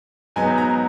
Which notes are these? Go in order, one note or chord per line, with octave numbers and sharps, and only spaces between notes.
G#2 F#3 B3 D#4 G#5
A#5